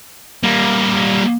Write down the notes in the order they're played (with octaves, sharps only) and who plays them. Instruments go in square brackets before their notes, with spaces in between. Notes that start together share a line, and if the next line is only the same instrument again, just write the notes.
[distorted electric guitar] G3 A#3